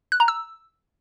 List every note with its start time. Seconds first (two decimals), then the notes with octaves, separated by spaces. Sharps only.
0.12 F#6
0.20 A#5
0.28 E6